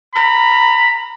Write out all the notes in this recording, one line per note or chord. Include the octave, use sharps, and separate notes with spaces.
A#5 B5